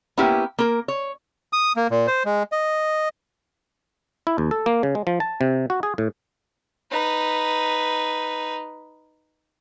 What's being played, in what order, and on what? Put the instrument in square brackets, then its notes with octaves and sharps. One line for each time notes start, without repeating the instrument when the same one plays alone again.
[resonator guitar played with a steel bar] A#3 B3 C#4 E4 G4
A#3 A#4
C#5
[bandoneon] D#6
A#3
A#2
C5
G#3
D#5
[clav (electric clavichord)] E4
D#2
A4
A#3
C#3
G#3
F3
A5
C3
F#4
G#4
A2
[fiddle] D#4 B4